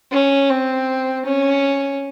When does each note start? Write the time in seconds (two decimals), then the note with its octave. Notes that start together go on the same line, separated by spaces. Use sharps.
0.12 C#4
0.49 C4
1.26 C#4